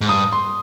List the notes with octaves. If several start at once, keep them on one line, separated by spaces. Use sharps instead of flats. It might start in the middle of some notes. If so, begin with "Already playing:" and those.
G#2
G2 D#6
C6